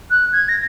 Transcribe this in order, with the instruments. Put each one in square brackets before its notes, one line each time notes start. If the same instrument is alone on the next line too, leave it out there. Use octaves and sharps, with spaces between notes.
[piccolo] F#6
G#6
A#6